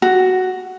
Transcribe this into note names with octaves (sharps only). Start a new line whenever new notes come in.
F#4